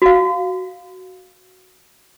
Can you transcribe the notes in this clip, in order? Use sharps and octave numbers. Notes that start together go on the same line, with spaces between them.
F#4 F5